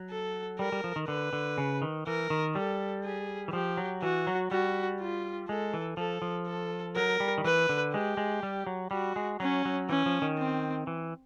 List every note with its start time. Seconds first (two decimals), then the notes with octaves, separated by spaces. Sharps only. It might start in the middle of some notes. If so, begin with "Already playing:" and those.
Already playing: F#3
0.10 A4
0.59 G3 A#4
0.72 G3
0.84 F3
0.96 D#3
1.08 D3 B4
1.33 D3
1.58 C#3
1.82 D#3
2.07 E3 A#4
2.30 D#3
2.55 G3 A4
3.04 G#4
3.48 E3
3.53 F3 G4
3.77 F#3
4.02 E3 F#4
4.27 F#3
4.51 G3 F#4
5.00 F4
5.49 G#3 A4
5.74 E3
5.97 F3 A4
6.22 F3
6.47 A4
6.96 F#3 A#4
7.20 G3
7.38 D#3
7.44 E3 B4
7.69 D3
7.93 G#3 G4
8.17 G#3
8.43 G3
8.67 F#3
8.91 G3 F#4
9.16 G#3
9.40 F#3 C#4
9.65 F#3
9.89 E3 C#4
10.06 F3
10.22 D#3
10.38 C4
10.87 E3